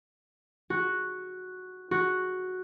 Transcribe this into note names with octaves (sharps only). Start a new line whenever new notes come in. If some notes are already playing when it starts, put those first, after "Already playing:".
F#4
F#4